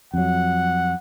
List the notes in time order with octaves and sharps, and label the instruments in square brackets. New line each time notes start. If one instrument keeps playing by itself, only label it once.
[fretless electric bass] F2 F#3 [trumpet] F#5